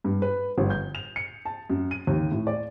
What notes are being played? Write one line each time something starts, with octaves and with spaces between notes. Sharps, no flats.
G2
B4
G1
G6
F7
C#7
A5
F#2
D#7
D#2
A2
D5